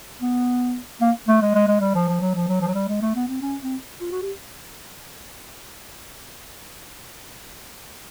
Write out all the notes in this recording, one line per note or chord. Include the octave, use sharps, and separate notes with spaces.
B3
A#3
A3
G#3
G#3
G#3
G3
F3
F3
F#3
F3
F#3
F3
F#3
G3
G#3
A3
B3
C4
C#4
C4
F4
F#4
G4